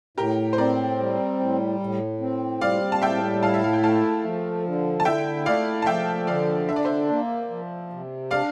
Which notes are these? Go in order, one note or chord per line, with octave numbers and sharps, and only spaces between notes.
A2 G4 A#4
C5
C4 A#4 D5
G3
A2
A2
C4
G3 D5 F5
A5
A2 E5 G5
E4 F5 A5
E5
F5
G5
A3 F5 A5
F3
D3
A5
E4 E5 G5
A3 D5 F5
A5
F3 E5 G5
D3 D5 F5
D4 E5
D5
C5 E5
A#3
F3
C3
D4 D5 F5